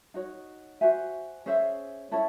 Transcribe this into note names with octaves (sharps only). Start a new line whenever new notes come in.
D#4 F#4 C#5
F#4 C5 E5 G#5
C#4 G#4 C5 E5
C#4 E4 A4 C#5